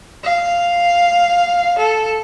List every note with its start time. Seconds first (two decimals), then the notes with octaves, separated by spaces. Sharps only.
0.24 F5
1.79 A4